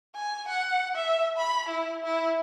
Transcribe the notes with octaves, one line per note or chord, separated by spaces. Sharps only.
G#5
F#5
E5
B5
E4
E4